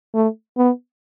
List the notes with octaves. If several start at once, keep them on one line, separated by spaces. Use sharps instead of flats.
A3
B3